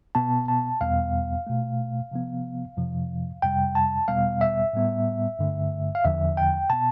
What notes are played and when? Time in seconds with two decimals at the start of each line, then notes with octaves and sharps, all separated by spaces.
0.15 B2 B3 A5
0.48 A5
0.81 E2 B2 G3 B3 F5
1.47 B2 A3
2.11 C3 F3 B3
2.77 F2 C3 F3
3.42 F2 C3 G3 G5
3.75 A5
4.08 E2 B2 G3 B3 F5
4.41 E5
4.73 A2 G3 B3
5.39 G2 D3 A3
5.95 F5
6.04 E2 D3 F3 E5
6.37 G5
6.70 B2 B3 A5